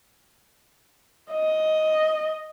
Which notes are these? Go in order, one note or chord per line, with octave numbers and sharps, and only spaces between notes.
D#5